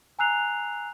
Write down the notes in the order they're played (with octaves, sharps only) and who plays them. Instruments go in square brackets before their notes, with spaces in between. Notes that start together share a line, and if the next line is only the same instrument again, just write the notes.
[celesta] G#5 A#5 E6 F#6 C7 F7